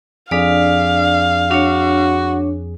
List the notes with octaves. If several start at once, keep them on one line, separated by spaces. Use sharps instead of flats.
F2 D4 G#4 D5 F5 B6
D4 F#4 C#5